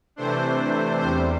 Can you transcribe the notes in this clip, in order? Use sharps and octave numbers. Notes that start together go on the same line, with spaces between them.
C3 E3 A3 D4 C5
E2 C3 G3 C5